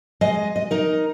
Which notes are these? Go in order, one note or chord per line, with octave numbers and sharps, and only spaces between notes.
G#3 D#5
D#5
D#4 A#4